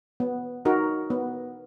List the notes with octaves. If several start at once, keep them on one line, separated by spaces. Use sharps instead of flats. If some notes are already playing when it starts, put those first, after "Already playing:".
B3
D#4 F#4 A#4
B3